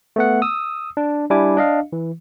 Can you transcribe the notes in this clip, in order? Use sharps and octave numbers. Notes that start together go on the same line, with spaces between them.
A3 B3 F#5
D#6 E6
D4
G3 D4 E4 G#5 D6
D4 D#5 F5
E3